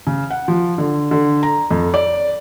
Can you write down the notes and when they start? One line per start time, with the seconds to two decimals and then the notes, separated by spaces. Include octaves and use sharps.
0.07 C#3
0.30 F#5
0.48 F3
0.78 D3
1.11 D3
1.43 A#5
1.71 F2
1.94 D5